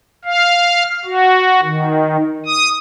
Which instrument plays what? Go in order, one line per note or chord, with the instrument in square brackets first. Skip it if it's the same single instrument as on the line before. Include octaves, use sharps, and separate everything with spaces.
[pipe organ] F5
F#4
D#3
D#6